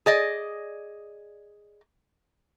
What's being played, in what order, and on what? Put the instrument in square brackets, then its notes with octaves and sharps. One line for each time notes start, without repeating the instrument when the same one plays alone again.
[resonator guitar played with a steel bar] G#4 D5 D#5